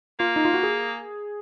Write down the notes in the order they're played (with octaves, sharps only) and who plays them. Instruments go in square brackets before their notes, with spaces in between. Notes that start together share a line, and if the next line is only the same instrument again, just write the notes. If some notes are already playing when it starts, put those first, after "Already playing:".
[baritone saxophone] A#3 [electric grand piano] F4
[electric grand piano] D#4
F4
F#4
G#4